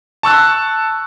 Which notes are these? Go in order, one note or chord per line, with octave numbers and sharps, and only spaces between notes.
A5 C#6 E6 F#6